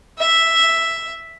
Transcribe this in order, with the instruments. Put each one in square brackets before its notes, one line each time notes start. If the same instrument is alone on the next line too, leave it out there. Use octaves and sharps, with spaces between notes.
[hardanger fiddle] E5